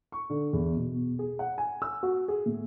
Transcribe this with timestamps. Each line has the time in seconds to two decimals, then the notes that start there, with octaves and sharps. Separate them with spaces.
0.12 C#6
0.30 D3
0.53 E2
0.76 B2
1.19 G#4
1.39 F#5
1.58 G#5
1.82 E6
2.03 F#4
2.28 G#4
2.46 A2